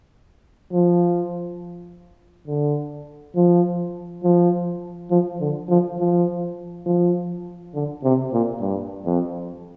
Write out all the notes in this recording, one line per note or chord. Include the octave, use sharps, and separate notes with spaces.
F3
D3
F3
F3
F3
D3
F3
F3
F3
D3
C3
A#2
G2
F2